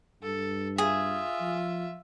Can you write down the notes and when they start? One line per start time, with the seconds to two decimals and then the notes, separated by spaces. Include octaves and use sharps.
0.23 G2 A4
0.78 F4 G#4 E5
1.41 F3